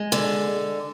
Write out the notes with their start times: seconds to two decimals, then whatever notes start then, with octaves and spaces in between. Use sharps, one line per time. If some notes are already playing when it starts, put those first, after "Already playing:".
Already playing: G#3
0.12 D3